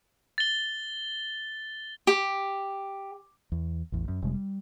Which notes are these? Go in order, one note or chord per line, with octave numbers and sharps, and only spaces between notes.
A6 G7
G4
E2
A1 E2
F#2
F1 C3 G3 G#3
G3